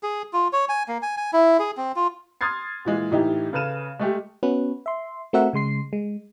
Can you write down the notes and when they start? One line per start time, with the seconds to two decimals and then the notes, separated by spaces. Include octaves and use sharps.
0.03 G#4
0.33 F4
0.53 C#5
0.69 G#5
0.88 A#3
1.02 G#5
1.17 G#5
1.33 E4
1.59 G#4
1.77 C4
1.96 F4
2.41 C6 D#6 F6 G#6 A6 C7
2.85 A#2 E3 G#3
3.11 A2 E3 D#4 E4 G4
3.53 C#3 A4 B4 F6 D#7 E7
3.99 G#3 A3 G4
4.43 B3 C#4 F#4 B4
4.86 E5 C6
5.33 A3 C4 F#4 A#4 E5 F#5
5.53 C#3 G#3 C6 C7
5.93 G#3